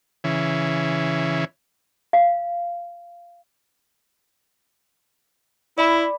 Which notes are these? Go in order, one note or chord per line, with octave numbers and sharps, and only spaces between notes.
C#3 E3
F5
E4 D5 B5